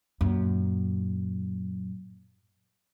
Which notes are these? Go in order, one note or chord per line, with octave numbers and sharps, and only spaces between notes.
F#2 A#2